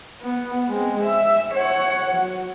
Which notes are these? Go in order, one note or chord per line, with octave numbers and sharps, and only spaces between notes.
B3
G#3 C4
E5
C#5 F#5
F#3